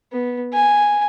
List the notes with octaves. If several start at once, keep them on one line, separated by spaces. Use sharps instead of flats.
B3
G#5